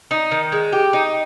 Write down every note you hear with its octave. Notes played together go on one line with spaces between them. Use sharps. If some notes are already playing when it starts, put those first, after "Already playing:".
D#4
D#3
G#3
G4
D#4